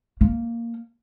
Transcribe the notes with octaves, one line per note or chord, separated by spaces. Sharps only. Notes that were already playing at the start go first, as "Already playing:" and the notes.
A#3